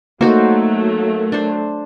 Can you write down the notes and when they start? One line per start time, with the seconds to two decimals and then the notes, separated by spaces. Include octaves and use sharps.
0.21 F#3 A3 A#3 D#4 F#4 C5
1.32 D4 C5